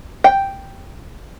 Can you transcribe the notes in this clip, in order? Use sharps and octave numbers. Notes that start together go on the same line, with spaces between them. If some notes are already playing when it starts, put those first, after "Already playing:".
G5